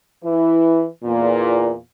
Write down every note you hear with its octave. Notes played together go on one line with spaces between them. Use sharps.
E3 E4
E2 A#2